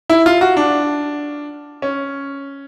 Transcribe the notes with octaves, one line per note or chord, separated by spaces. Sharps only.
E4
F4
F#4
D4
C#4